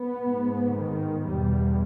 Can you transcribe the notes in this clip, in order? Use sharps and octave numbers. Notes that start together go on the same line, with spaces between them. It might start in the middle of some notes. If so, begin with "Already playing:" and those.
Already playing: B3
G#2
D#3
E2 B2 G3